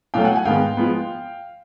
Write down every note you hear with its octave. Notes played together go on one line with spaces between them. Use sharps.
B2 F#3 A3 F5 G5
F#5 G#5
F#5 G#5
G#2 D#3 G#3 B3 F5 G5
F3 G#3 B3